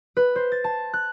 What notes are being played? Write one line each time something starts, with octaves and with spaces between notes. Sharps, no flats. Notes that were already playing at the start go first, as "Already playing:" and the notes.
B4
C5
A6
A5
F#6